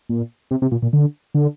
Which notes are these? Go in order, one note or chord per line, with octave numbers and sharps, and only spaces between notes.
A#2
C3
C3
A#2
A#2
D3
D3